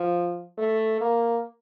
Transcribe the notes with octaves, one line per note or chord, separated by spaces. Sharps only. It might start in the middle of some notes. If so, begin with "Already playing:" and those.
Already playing: F3
A3
A#3